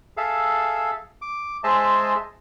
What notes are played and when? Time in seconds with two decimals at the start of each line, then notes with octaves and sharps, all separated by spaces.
0.17 G#4 A4 E5 F5
1.22 D6
1.64 G#3 G#4 C5 D#5 E5 A5